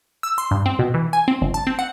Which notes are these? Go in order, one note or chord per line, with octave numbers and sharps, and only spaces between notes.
E6
C6
G2
C4
B2
E3
G#5
C4
G1
A5
C4
F#5